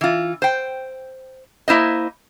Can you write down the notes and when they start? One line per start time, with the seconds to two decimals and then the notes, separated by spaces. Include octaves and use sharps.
0.01 E3 F4
0.42 C5 G5
1.68 A#3 E4 C5 D#5